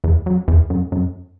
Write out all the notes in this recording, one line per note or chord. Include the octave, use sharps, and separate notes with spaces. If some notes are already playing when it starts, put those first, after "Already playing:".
E2
F#2
E2
F#2
F#2